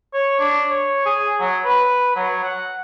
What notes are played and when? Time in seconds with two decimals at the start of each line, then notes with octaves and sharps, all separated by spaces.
0.14 C#5
0.40 D4
0.70 C#5
1.06 G#4
1.40 F#3
1.65 B4
2.16 F#3
2.44 F#5